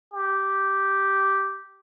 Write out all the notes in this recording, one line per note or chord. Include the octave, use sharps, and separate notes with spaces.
G4